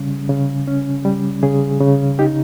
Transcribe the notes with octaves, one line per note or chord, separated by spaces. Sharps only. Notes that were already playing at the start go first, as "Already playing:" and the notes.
Already playing: C#3 G3 C#4
C#3
C#4
G3
C#3 G#4
C#3
D#4 G4